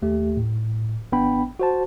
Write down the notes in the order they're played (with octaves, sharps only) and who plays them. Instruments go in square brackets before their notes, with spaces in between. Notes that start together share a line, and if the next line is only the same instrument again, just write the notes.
[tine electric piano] D#2 A3 G4
A2
G#1 B3 D4 G5 B5
F#4 C5 A5